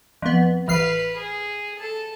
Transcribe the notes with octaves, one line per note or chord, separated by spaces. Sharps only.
F2 B3
A1 B4 F6 C7
G#4
A4 A5